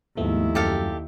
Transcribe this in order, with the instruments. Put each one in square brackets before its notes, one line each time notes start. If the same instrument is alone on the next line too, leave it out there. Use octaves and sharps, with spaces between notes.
[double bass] D#2 E4 [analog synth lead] G#2 [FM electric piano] F3 A3 B3
[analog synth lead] F#2 [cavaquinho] G4 A4 F5